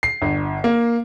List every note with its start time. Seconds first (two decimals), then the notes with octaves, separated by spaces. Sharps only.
0.03 C7
0.22 G1
0.64 A#3